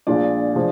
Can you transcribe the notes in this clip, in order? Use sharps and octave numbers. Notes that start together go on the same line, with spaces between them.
A#1 A#2 G#3 D4 D5
F3 G#3